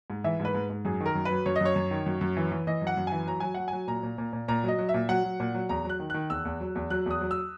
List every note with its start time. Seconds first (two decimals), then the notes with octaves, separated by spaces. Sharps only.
0.10 G#2
0.24 E3 E5
0.40 G#2 B4
0.54 G#2
0.70 G#2
0.85 F#2 G#4
1.01 D#3 A#4
1.15 F#2
1.25 B4
1.31 F#3
1.46 F#2 C#5
1.56 D#5
1.61 F#2 C#5
1.76 F#2
1.91 D#3
2.06 F#2
2.21 F#2
2.37 E3
2.52 E3
2.67 E3 D#5
2.82 F#2
2.87 F#5
2.97 F#2
3.07 E3 G#5
3.27 F#3 A#5
3.40 F#3 G#5
3.55 F#3 F#5
3.68 G#5
3.73 F#3
3.87 A#2 A#5
4.03 A#2
4.18 A#2
4.33 A#2
4.48 A#2 A#5
4.63 F#3 D#5
4.79 F#3
4.89 E5
4.94 A#2
5.09 F#3 F#5
5.24 F#3
5.40 A#2
5.55 F#3
5.69 E2 A#5
5.85 F#3 F#6
6.00 D#3
6.10 D#3 F#6
6.30 E2 E6
6.45 E2
6.60 F#3
6.75 E2
6.90 F#3 F#6
7.06 E2 D#6
7.21 F#3
7.31 E6